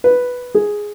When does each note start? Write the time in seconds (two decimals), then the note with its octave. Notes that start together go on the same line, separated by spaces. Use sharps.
0.04 B4
0.55 G#4